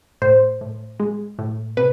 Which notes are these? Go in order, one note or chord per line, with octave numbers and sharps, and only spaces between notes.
A2 C5
A2
G#3
A2
C3 B4